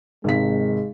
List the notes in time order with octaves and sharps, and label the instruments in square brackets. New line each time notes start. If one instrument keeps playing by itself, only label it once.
[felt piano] G#1 C3 B6 [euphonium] G#3